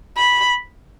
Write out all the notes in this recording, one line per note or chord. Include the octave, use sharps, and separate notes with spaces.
B5